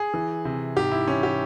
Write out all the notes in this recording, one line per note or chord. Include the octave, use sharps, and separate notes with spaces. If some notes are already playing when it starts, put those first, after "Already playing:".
Already playing: G#4
E3
C3
G#2 G4
E4
E3 C#4
G4